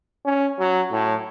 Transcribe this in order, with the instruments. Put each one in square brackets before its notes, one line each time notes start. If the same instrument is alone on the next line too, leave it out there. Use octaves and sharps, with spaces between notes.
[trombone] C#4
F#3
A2